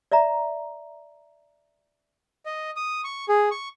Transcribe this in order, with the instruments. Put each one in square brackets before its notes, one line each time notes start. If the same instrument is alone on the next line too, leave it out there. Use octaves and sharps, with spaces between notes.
[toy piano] D5 E5 A#5
[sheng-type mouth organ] D#5
D#6
C#6
G#4
C#6